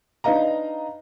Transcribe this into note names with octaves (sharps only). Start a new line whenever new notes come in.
D4 D#4 B4 D#5 F5 A#5